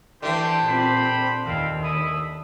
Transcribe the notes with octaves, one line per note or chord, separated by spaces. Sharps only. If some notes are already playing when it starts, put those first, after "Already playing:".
D3 E3 A3 G4 C5
A#2 C4 G4 C5 B5
D#2 C4 E4 F5
E4 E5 D#6